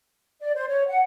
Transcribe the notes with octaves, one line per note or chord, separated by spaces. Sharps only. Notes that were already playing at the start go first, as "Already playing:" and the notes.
D5
C5
C#5
F#5